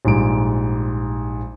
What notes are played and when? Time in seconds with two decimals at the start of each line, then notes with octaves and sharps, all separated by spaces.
0.05 A#1 G#2 G3 D7